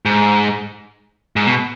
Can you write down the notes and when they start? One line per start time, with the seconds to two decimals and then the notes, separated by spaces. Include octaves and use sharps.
0.05 G#2
1.36 G#2
1.46 B2